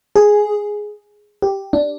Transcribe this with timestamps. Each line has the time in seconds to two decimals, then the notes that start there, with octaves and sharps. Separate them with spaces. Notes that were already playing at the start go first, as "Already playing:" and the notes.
0.16 G#4
1.42 G4
1.73 D4